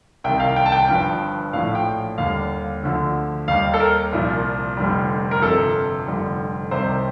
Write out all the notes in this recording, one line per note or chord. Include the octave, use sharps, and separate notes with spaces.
C2 C3 D#3 G5
F5
G5
A5
G5
G1 G2 F3 G5
A#1 A2 F3 F5
G5
D#2 D3 G3 F5
D2 D3 F3
D#2 D#3 G3 F5
A4
A#4
C2 A#2 F3
F1 F2 D3 G3
A#4
G1 F2 C3 F3 A4
F1 F2 D3 G3
C2 C3 D#3 G3 C5